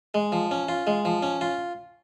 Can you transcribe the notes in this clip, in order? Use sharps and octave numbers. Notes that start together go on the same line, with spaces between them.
G#3
F3
C#4
F4
G#3
F3
C#4
F4